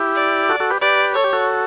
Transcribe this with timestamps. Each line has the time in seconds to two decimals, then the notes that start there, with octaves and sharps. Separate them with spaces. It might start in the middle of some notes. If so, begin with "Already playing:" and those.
Already playing: E4 G4
0.16 D5
0.49 F#4 A4
0.60 F#4 A4
0.70 G4 B4
0.81 G4 B4 D5
1.15 A4 C#5
1.24 G4
1.33 F#4 A4